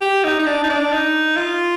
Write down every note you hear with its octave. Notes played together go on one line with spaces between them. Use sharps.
G4
D#4
D#4
D4
D#4
D4
D#4
F4